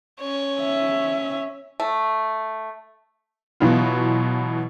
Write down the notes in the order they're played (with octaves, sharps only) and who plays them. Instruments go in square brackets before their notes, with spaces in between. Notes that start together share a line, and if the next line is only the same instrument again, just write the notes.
[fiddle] C#4 C#5
[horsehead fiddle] E5
[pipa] A3
[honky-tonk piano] B2 E3 F#3 B3 F4